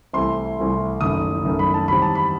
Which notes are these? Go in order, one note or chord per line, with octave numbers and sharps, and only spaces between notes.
C2 C3 E3 A3 E4 C6
C2 C3 E3 A3 E4
F#1 F#2 D#3 A3 D#6
F#1 F#2 D#3 A3
B5
A5
E2 D#3 G3 C4 B5
A5
B5